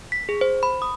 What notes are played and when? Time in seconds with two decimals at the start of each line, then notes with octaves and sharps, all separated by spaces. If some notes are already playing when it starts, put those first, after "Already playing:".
0.12 B6
0.29 G#4
0.41 C5
0.63 B5
0.82 D#6